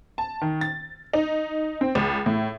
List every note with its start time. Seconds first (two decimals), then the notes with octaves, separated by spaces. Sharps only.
0.18 A5
0.42 D#3
0.61 A6
1.13 D#4
1.81 C4
1.95 C#2
2.26 A2